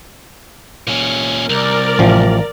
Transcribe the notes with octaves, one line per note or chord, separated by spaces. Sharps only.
A#2 C#4
C2 A#4 D5
A1 F3